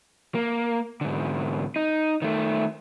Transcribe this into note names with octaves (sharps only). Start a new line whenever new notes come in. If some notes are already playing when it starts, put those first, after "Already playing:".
A#3
G#2 D3
D#4
D#3 A3